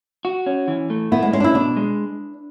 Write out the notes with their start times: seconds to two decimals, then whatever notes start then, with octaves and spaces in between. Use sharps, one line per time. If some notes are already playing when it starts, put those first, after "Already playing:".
0.25 F#4
0.46 C#4
0.68 E3
0.90 A3
1.12 B3 E4
1.23 G#3
1.33 G#3 C#4
1.40 D4
1.44 E4
1.55 B2 D4
1.76 G#3